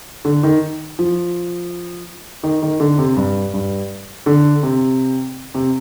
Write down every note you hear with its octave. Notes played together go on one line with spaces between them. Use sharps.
D3
D#3
F3
D#3
D#3
D3
C3
G2
G2
D3
C3
C3